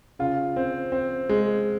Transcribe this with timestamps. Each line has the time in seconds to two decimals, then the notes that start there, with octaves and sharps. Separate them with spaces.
0.19 C#3 F4
0.56 C4
0.92 C4
1.29 G#3